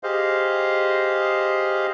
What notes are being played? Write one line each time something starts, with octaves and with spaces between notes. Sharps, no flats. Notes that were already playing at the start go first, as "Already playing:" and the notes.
G4 G#4 C5 D#5 F5